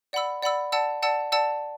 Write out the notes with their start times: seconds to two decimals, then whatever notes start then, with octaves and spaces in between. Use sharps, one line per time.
0.13 D5 F#5 B5 E6
0.42 D5 F#5 B5 E6
0.72 D5 F#5 A5 E6
1.02 D5 F#5 A5 E6
1.32 D5 F#5 A5 E6